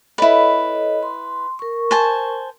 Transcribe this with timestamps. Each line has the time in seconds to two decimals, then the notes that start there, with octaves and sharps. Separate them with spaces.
0.18 E4 A4 B4 C#5 D#5
1.03 C6
1.59 A#4 C#6
1.91 C5 G#5 A5